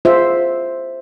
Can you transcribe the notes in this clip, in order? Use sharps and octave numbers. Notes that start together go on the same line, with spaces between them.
F4 G#4 C5 E5